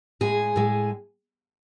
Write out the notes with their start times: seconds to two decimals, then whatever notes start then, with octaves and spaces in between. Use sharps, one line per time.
0.21 A2 G#3 G#4
0.56 A2 G#3